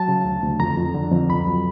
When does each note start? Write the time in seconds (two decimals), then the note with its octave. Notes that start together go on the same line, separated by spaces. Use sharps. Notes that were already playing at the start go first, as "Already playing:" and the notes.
Already playing: F#3 A5
0.08 C#3
0.25 D2
0.42 D2
0.60 F2 A#5
0.77 F2
0.94 D3
1.12 F2
1.30 C#2 B5
1.47 F#3